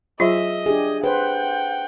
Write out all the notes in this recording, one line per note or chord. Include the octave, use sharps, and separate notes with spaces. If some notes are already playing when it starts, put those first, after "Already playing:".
F#3 F4 G#4 D#5 E5
D4 G4 G#4
B4 C5 F#5 G5